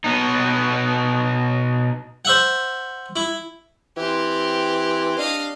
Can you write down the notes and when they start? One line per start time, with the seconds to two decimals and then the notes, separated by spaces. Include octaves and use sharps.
0.04 B2 B3 D#4
2.25 C5 E5 F#5
3.16 E4
3.97 E3 C4 G4
5.18 D4 D#5 F5